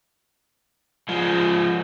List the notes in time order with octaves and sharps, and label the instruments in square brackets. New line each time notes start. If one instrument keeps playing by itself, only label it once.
[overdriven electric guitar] F3 G#3